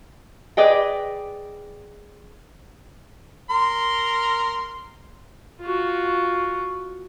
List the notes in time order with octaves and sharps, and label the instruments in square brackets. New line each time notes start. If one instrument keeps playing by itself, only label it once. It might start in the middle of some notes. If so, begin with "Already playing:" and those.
[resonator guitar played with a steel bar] G#4 B4 D5 D#5 G5
[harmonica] A#4 C6
[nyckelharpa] F4 F#4